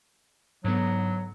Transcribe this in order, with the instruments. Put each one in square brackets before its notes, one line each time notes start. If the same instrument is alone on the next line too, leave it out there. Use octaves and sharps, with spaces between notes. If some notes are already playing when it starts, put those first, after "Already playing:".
[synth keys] G#2 D3 B3 [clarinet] F#3